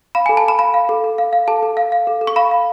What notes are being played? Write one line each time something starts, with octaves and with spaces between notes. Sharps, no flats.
F5 B5
G#5
A4
A5
A4 B5
F5 B5
F5
A4
A4
F5
F5
A4 A5
A4
F5
F5
A4
A4
C#6
F5 B5
F5